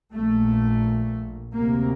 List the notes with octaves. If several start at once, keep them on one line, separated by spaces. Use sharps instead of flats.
A#1 A#2 A3
D2 C3 A#3